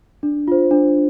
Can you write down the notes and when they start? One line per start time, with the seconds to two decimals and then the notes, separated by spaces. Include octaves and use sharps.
0.23 D4
0.48 F4 C5
0.71 D4